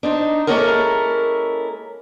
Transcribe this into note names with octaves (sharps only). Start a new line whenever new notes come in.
D4 D#4 C5
G#3 A#3 C#4 E4 A4 A#4